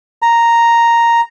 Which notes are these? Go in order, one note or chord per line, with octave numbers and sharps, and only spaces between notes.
A#5